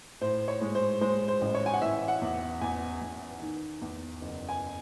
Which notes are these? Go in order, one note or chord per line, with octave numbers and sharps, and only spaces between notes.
A2 C5
C#5
G#3
C5
G#3 C5
C5
A1
C#5
G#5
F#5
E3 E5
F#5
E2
E2 G#5
E2
D#3
E2
F#1
G#5